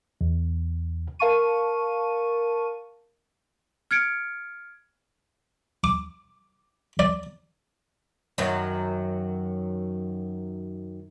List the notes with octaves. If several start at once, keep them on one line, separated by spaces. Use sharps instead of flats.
E2
A#4 F5 A5 C#6 D#7
F6 G#6 C#7 D7
D6
D5
F#2 D#3 F#3